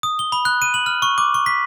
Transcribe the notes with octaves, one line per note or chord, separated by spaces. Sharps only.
D#6
G7
B5
F#6
D#7
F#7
F6
C#6
D6
C#6
B6